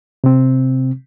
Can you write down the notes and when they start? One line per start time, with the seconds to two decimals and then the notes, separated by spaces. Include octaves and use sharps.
0.24 C3 C4